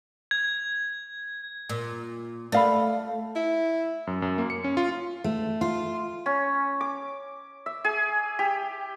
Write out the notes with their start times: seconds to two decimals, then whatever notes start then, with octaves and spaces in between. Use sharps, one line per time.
0.31 G#6
1.69 A#2
2.52 A3 D5 F5 B5
3.36 E4
4.07 F#2
4.22 F#2
4.38 A#3
4.50 C#7
4.64 C#4
4.77 F4
5.24 A3
5.61 F4
6.26 C#4
6.81 D6
7.66 E5
7.84 G#4
8.39 G4